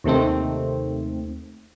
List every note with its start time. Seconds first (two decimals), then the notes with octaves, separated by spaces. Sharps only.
0.04 D#2 C3 D#3 A3 C4